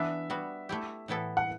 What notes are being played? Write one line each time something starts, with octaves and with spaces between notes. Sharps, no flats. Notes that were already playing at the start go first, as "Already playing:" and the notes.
Already playing: E3 B3 D4 E5
G3 B3 F#4
A3 E4 G4
A2 E3 B3 E4 A4
F#5